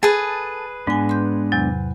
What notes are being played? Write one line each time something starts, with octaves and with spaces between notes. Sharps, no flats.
G#4 A4 B4 A5
G#2 G#3 B3 D4 G#5
C6 G6
E2 C3 F#3